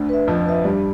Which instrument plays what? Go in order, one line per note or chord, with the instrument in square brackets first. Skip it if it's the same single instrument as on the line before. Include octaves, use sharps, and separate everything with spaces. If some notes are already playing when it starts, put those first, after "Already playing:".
Already playing: [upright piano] D2 D3
[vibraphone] B4 E5
[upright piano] F2 F3 [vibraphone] F4
[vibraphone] B4 E5
[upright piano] G2 G3 [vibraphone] D4